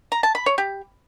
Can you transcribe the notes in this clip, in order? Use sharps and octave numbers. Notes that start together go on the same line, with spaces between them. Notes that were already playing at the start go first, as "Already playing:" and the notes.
A#5
A5
B5
C#5
G4